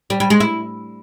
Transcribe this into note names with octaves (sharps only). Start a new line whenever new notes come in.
G3
G3
G#3
E4